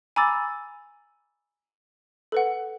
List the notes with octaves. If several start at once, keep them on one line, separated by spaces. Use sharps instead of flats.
G#5 A#5 B5 D6 E6 A6
A4 B4 F#5